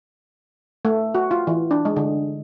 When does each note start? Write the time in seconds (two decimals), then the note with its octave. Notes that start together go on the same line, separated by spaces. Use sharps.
0.85 A3
1.15 F#4
1.31 F4
1.47 E3
1.71 D4
1.85 G#3
1.97 D3